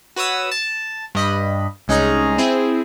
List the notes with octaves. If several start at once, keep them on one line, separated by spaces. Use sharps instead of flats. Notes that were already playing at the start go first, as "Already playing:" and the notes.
F#4 B4 C#5 D#6 E6
A5
G2 D#5 B5
C2 G#3 C#4 D#4 G#4 A#5
C4 E4 G#4